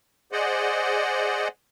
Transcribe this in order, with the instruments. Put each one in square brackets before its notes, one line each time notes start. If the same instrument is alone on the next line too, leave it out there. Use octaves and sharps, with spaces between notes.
[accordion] G#4 C5 D5 D#5 F#5